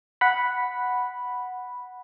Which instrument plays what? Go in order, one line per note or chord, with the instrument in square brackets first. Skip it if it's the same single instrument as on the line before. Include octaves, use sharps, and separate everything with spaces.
[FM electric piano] F#5 B5